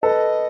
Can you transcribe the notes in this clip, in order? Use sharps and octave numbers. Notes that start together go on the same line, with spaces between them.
A4 B4 D#5